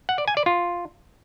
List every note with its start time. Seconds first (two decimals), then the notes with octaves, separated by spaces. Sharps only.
0.09 F#5
0.18 D5
0.28 G#5
0.37 D5
0.46 F4